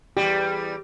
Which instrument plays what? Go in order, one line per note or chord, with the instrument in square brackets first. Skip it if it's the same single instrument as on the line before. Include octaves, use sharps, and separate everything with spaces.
[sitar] E2 G3 [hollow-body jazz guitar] G4